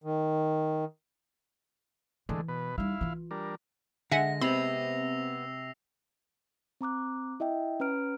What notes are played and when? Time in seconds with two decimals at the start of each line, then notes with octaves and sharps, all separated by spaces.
0.04 D#3
2.29 D3 E3 G#3 A3
2.48 B2 B4
2.78 G3 D#4 E4 F5
3.01 E3 F4
3.31 G3 D4 A#4
4.12 D3 G#3 E5 F#5 G#5 A#6
4.41 C3 B3 C4 B5 E6 C7 F7
6.81 C4 A#5 D6 F#6
7.40 E4 D#5 E5 G5
7.80 C#4 B4 A#5 F6 D7